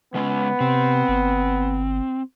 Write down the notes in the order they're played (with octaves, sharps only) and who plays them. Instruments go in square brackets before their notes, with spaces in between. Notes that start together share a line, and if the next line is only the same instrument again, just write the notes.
[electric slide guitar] C#3 G#3 C#4 [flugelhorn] B3
[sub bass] C3 [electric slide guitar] C4
[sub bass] G1